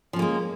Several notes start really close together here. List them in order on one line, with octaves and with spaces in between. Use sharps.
F3 C#4 A#3 G#3